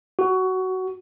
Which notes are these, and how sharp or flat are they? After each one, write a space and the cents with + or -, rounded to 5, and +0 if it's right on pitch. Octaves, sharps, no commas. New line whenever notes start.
F#4 +15